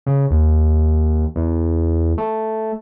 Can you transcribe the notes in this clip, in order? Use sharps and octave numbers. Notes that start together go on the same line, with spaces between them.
C#3
D#2
E2
A3